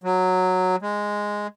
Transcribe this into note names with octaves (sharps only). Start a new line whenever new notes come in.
F#3
G#3